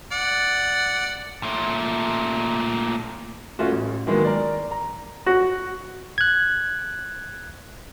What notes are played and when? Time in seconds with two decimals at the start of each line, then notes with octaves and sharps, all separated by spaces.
0.12 D5 F#5
1.43 A#2 A3
3.59 A3 C#4 F4 F#4
3.72 A1
4.07 D#3 E3 F#3 G#3 A#3 B3
4.25 A#4 D5
4.71 A#5
5.26 F#4
6.18 F#6 G#6